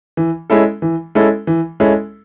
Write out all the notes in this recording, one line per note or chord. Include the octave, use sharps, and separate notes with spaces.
E3
G#3 C#4 E4 A4
E3
G#3 C#4 E4 A4
E3
G#3 C#4 E4 A4